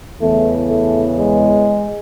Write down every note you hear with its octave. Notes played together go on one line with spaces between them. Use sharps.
E2 C#3 E3 A3
A3
G#3